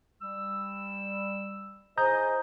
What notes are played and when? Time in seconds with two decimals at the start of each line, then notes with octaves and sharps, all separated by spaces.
0.21 G3 E6
1.98 E4 G#4 C5 D#5 A#5 D#6 G6